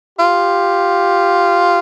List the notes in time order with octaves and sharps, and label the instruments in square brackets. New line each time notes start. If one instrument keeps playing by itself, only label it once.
[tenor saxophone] F4 [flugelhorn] G4